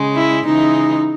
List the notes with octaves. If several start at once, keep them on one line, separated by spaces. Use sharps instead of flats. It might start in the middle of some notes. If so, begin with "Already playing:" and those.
Already playing: C#3 G#3
E4
C#3 E3 G#3 D#4